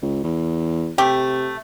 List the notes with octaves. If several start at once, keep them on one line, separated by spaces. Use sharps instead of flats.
C#2
E2
C3 A3 G4